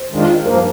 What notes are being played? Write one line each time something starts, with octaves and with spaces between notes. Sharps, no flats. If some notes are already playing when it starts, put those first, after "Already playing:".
Already playing: C5
D#3 G#3 D4 F4
G2 F3 A#3 A#4